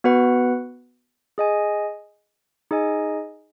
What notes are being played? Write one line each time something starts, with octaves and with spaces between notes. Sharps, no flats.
B3 F#4 B4 F#5
G#4 D#5 G#5
D#4 G#4 D#5 G#5